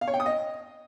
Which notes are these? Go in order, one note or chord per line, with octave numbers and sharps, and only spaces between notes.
F5
C#5
G5
D#6
D#5